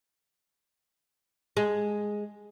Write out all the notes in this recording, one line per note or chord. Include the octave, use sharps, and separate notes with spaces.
G#3